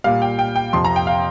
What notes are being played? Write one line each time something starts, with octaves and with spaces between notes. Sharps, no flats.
A#2 G3 F5
G5
G5
G5
F2 C3 F3 C6
A#5
G5
F5